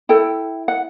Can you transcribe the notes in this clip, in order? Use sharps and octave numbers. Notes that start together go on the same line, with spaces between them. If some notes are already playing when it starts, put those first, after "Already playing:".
E4 A4 G5
F#5